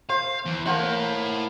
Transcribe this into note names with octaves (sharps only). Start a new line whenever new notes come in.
C5 F5
E2
A#3 E4 C5 C#5 F#5